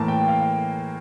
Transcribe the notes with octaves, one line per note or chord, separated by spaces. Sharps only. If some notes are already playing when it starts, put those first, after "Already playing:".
Already playing: A2 E3 A#3 A5
G5
F5